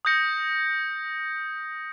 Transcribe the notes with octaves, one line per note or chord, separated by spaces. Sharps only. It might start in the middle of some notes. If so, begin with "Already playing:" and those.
D#6 G6 A#6 C#7